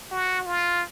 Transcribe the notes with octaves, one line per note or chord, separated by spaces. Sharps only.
F#4
F4